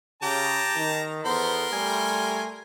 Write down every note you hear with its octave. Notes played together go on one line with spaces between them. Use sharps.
C#3 G4 A5 A#5
D#3
E2 B3 A4 A#4 C5 C6
G3 A3 G#5